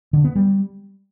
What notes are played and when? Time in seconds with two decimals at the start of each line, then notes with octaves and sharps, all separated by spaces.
0.13 D3
0.24 B3
0.36 G3